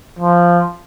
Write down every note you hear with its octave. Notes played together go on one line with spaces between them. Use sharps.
F3